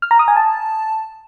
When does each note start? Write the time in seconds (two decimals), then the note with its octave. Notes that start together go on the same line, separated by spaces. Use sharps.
0.02 F6
0.11 A#5
0.19 D#6
0.28 G#5
0.36 A5